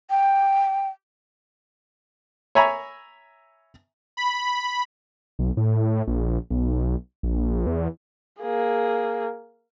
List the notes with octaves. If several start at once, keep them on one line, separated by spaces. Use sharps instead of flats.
G5
C#5 E5 G#5 A#5 B5
B5
B1
A2
A#1
B1
A#1
E2
A#3 G#4